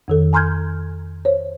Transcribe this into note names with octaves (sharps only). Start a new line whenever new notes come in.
F2 D#3 A4
G#5 A#5 C6 F6 G6 G#6
C5 C#5